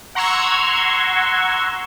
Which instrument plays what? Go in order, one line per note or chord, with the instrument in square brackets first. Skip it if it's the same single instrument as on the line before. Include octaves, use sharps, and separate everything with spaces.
[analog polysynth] F#5 A#5 C6 C#6 E6 G#6